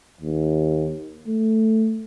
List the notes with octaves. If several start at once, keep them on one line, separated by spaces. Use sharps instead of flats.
D#2
A3